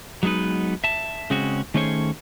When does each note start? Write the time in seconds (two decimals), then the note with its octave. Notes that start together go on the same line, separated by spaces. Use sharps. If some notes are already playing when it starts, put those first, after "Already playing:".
0.23 F#3 G#3 B3 D#4 B4
0.84 E5 A5
1.30 C#3 G#3 C4 C#4 F#4
1.74 D#3 A3 C#4 G#4 C5 C#5